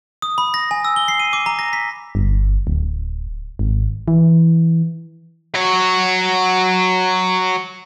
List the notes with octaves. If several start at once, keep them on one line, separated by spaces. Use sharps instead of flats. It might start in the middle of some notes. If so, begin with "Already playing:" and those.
D#6
B5
A#6
G#5
E6
G7
C7
D#7
D6
A#5
A#6
B6
G1
D1
G#1
E3
F#3 C#5